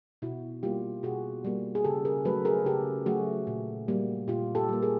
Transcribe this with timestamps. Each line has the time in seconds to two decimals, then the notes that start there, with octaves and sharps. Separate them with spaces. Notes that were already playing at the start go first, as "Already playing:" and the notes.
0.22 B2 E4 F#4
0.63 G3 A#3 F4 G4
1.03 B2 F#4 G#4
1.45 G3 A#3
1.75 G#4
1.84 C#3 G4 A4
2.05 G#4 A#4
2.25 F#3 A3 A4 B4
2.45 G#4 A#4
2.65 C#3 G4 A4
3.06 F#3 A3 F#4 G#4
3.47 A#2
3.88 G3 A#3
4.28 A#2 F4 G4
4.55 G4 A4
4.69 G3 A#3
4.82 G#4 A#4